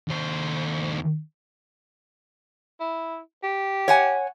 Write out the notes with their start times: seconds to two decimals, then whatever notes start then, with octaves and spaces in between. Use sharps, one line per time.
0.08 D#2 C5
2.81 E4
3.43 G4
3.88 C#5 F#5 G#5